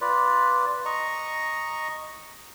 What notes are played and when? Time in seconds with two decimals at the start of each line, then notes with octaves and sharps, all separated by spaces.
0.01 F4 B4 D5
0.85 D#5 A#5 C#6